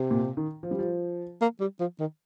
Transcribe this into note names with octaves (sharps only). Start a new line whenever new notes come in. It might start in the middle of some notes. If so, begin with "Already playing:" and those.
Already playing: C3
A#2
D#3
F3
G3
F3
A#3
G3
F3
D#3